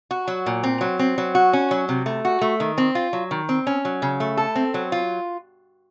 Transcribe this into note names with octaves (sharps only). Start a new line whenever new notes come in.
F#4
F#3
A#2
C4
F#3
C4
F#3
F#4
C#4
F#3
C3
A3
F#4
A3
D#3
C4
F4
F#3
D#3
C4
C#4
F#3
C#3
A3
A4
C4
F#3
F4